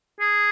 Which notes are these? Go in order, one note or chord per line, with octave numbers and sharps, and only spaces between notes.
G#4